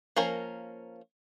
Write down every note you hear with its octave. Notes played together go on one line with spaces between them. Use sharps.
F3 A#3 C#4 A#4